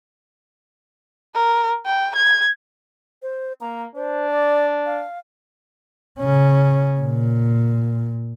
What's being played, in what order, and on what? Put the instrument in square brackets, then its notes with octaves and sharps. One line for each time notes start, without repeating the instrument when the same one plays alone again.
[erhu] A#4
G5
G#6
[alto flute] C5
[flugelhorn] A#3 [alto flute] A#5
[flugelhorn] D4 [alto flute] C5
[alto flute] D5
F5
[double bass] C#3 C#4
A#2